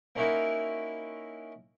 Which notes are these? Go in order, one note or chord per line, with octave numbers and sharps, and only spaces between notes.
A#3 C#4 D#4 E4 F#4 A#4